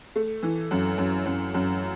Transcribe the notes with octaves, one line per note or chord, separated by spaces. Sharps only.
A3
E3
F#2
F#2
F#2
F#2